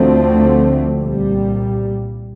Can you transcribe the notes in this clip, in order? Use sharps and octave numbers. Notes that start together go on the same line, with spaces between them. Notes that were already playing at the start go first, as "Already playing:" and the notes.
Already playing: D2 D3 F3 A3 C4
C2 A#2 G3